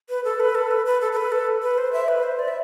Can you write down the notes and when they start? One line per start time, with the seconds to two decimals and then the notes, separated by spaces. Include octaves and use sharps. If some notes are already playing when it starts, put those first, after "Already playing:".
0.09 B4
0.24 A4
0.40 B4
0.55 A4
0.71 B4
0.86 B4
1.01 A4
1.12 A4
1.17 B4
1.32 A4
1.62 B4
1.78 C5
1.93 E5
2.08 B4
2.23 C5
2.39 D5
2.48 E5